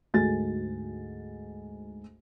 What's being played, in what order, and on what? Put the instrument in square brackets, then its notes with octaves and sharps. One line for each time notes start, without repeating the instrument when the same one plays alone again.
[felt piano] D2 G#2 F#4 G#5 A6